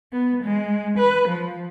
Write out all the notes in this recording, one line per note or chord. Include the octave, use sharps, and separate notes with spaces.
B3
G#3
B4
F3